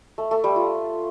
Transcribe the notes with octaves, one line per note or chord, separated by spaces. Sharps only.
A3
A3
G3
F4